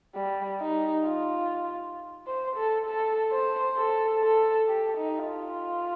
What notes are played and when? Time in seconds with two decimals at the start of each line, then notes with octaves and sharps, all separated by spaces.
0.15 G3
0.61 D#4
1.06 F4
2.27 C5
2.56 A4
2.87 A4
3.32 C5
3.77 A4
4.23 A4
4.68 G4
4.98 D#4
5.28 F4